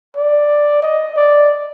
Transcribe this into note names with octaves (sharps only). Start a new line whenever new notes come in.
D5
D#5
D5